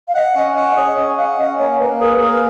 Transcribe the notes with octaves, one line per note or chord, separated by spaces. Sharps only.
F5
D#5 F#5
C#4 D#5
F#5
D#5
G#4 C#5
C#4 D#5
F5 F#5
F5
C#4 D#5
A#3 C#5
A#3 B4
G#4 A#4
B4
A#3 A#4